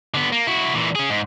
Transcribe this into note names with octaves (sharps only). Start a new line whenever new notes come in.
D3 B3
A#3
E4 F#4
A#2 E3
C#4 G#4
G#2